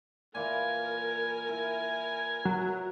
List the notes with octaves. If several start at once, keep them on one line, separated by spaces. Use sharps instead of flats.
A#2 E3 A#4 G#5 B5
E4
F#3